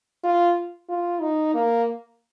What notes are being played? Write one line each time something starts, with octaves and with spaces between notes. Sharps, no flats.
F4
F4
D#4
A#3